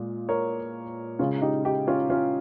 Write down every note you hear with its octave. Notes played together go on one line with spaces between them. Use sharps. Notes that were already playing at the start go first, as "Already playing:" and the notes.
Already playing: A#2 G#3
A#4 C#5
C#3 G#3 C#4 F4
D#4 G4
D#4 G4
C#4 F4
C#4 F4